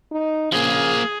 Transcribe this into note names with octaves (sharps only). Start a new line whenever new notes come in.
D#4
C#3 F3 A#3 G#4